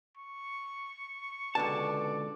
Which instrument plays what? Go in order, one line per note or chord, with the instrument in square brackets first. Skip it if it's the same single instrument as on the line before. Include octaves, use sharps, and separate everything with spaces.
[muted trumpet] C#6
[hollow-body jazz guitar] C#2 D3 A5 [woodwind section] B2 D5